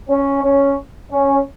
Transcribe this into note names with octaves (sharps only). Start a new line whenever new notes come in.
C#4
C#4
C#4